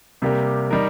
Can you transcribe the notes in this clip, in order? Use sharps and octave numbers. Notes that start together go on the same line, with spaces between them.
C3 G3 A#3 G4 A#4
G3 D#4 A#4